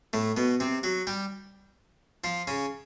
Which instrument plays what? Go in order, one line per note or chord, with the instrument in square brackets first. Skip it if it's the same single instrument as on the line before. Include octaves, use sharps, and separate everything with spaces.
[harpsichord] A2 A3
B2 B3
C3 C4
F#3 F#4
G3 G4
F3 F4
C#3 C#4